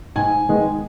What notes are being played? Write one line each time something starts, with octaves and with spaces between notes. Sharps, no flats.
G#2 G#5
D#3 G#3 B3